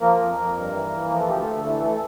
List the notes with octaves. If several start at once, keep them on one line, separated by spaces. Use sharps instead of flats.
F3 A#3 A#4
F2
F2
G2
E3
E3
F3 A#4
A4
D2 G4
A3 A4
D2
E3 A3 A4
A3 A4